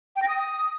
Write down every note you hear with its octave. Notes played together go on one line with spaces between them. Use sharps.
G5
A#6
D#6